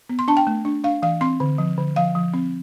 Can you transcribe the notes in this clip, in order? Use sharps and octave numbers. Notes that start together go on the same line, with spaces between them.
B3
C6
D4 A5
G5
A3
D4
D4 F5
E3 F5
C4 C6
D3
F3
D3
F3 F5
F3
C4